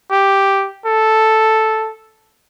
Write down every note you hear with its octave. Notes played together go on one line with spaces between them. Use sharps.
G4
A4